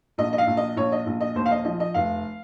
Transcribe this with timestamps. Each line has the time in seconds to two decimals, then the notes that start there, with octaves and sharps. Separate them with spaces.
0.18 A#1 D#5
0.33 D#5
0.38 F5
0.47 A#1
0.57 D#5
0.77 A#1 C#5
0.92 D#5
1.06 A#1
1.21 D#5
1.35 D#2 C5
1.46 F5
1.51 D#5
1.65 F3 D#5
1.80 D#5
1.94 F1 F5